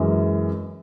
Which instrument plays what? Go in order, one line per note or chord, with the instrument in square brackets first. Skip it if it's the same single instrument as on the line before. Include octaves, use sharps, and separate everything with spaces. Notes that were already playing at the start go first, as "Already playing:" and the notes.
Already playing: [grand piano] F#2 E3 G#3 C#4